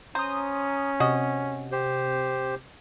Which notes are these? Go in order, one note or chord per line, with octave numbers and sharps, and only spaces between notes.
C#4 C5 A#5 D#6
C3 F#4 D#5
G4 C5